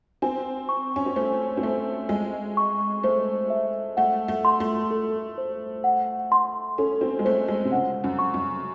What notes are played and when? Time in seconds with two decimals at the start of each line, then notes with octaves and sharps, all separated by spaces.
0.22 C4 G#5
0.69 C#6
0.96 C#4
1.06 C4
1.16 A3 C5
1.57 C4
1.63 A3 E5
2.09 G#3 G#5
2.57 C#6
3.03 A3 C5
3.50 E5
3.97 A3 F#5
4.28 A3
4.45 C6
4.60 A3
4.91 A4
5.38 C5
5.84 F#5
6.32 C6
6.78 C#4 A4
7.01 C4
7.19 G#3
7.25 A3 C5
7.48 G#3
7.65 C3
7.72 C#3 F#5
8.04 F#2
8.19 C#6
8.34 F#2